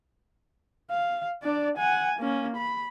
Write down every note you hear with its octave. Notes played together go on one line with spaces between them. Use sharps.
F5
D4 D5
F#5 G#5
A#3 C#4
B5